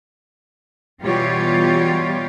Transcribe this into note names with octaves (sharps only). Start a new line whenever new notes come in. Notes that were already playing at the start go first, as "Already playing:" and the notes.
B2 E3 G3 F4 G4 C#5